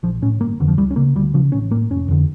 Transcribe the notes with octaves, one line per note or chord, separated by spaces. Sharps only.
A#1 F3
A2 C#4
G1 A#3
F2 D3 E3
F3
C#2 G3
C#4
C#3 A#3
D2 G3
C#3 F3
A1 C#4
A2 A#3
F1 C#4
F2 D3